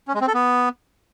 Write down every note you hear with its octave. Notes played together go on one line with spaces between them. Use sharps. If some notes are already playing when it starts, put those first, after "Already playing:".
C#4
G#3
C4
A4
B3